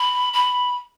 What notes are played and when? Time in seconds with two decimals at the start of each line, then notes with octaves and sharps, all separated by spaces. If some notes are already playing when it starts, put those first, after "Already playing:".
Already playing: B5
0.33 B5